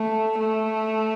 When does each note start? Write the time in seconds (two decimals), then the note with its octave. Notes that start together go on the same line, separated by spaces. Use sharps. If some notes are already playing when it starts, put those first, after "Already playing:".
Already playing: A3
0.40 A3